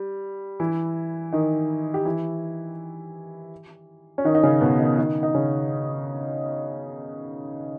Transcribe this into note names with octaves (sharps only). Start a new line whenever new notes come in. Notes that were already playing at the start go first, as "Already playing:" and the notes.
Already playing: G3
E3 E4
D#3 D#4
G4
E3 E4
C#4
D#3 D#4
D#4
C#3 C#4
B2 B3
D#3 D#4
D#3 D#4
D#4
C#3 C#4